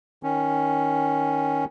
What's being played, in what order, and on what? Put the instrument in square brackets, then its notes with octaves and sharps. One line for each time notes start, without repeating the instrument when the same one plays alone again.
[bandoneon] D#3 C#4